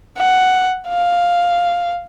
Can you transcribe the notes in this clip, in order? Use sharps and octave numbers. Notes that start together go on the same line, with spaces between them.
F#5
F5